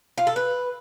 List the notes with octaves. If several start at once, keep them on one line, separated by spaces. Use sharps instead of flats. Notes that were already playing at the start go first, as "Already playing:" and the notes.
F4
A4
B4